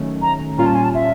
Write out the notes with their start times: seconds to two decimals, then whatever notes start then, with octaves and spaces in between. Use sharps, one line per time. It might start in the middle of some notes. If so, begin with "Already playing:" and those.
Already playing: D#3 F#3 A3 C#4
0.22 A#5
0.58 A#2 G3 A#3 C#4 F4 A#5
0.66 A5
0.75 G#5
0.84 A5
0.94 E5